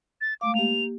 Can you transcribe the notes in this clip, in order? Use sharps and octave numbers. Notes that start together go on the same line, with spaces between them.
A6
G#3 A3 F5 D6
A#3 G4 F7